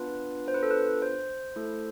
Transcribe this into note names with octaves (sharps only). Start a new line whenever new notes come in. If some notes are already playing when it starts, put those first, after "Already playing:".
Already playing: B3 D4 F4 B4
C5
B4
A4
B4
C5
A3 E4 A4